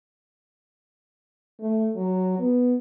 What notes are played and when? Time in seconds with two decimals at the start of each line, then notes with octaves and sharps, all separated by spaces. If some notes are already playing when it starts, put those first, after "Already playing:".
1.60 A3
1.96 F#3
2.39 B3